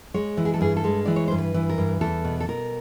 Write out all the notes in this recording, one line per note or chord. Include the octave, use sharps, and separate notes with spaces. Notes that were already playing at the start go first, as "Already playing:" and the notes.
G#3 C#5
E3
G#4
A4
G2 G#4
A4
G#3
E3 D5
C#5
G2 C5
B4
E3
A#4
G2
E2 A4
B2
A4
B2 A#4